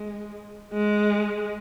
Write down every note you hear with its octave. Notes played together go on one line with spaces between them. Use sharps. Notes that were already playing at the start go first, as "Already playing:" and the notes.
Already playing: G#3
G#3